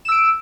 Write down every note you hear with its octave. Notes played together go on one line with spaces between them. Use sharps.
E6 D7 E7